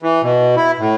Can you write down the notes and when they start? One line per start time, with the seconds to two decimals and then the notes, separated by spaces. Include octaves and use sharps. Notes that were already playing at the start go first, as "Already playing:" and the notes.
0.02 E3
0.23 B2
0.56 E4
0.79 A2